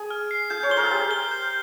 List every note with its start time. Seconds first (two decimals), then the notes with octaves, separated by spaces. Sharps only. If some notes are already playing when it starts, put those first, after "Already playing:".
Already playing: G#4
0.11 F6
0.31 C7
0.50 G#4 G6
0.63 C#5
0.70 C5 G7
0.77 A#4
0.84 G#4
0.91 G4 G6
1.11 G7
1.31 G6